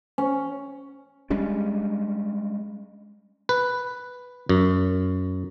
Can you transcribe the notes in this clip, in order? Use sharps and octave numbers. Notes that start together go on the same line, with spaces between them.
C#4
G3 G#3 C#4 D4
B4
F#2